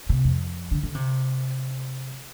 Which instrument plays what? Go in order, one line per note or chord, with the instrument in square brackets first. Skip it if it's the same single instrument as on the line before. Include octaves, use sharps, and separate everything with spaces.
[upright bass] C3
F2
D3
D3
C3